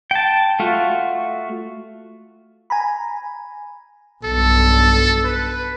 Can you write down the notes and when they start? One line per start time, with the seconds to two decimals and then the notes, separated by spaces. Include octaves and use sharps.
0.11 G5 A5
0.60 A3 F4 F#4
2.70 G#5 A#5 B5
4.24 B1 G2 A4
5.24 B4